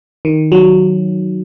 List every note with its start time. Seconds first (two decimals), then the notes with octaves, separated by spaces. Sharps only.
0.25 D#3
0.52 F#3